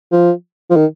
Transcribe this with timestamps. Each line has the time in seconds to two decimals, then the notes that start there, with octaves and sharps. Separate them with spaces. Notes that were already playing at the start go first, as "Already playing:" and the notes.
0.12 F3
0.70 F3
0.76 D#3